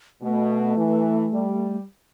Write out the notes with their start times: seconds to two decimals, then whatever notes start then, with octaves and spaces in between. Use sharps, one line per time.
0.22 B2 A3
0.76 E3
1.32 G3